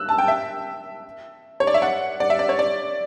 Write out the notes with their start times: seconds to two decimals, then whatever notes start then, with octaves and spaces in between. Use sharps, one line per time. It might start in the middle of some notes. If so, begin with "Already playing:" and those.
Already playing: E6 F#6
0.09 A5
0.18 G5
0.28 E5
1.60 C#5
1.67 D5
1.74 E5
1.82 F#5
2.20 D5
2.30 E5
2.39 D5
2.49 C#5
2.59 D5